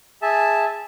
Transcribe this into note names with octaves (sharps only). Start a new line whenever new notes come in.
G#4 E5 A5